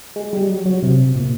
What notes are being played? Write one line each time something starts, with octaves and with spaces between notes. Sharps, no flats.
G#3
G3
F#3
F#3
C3
A#2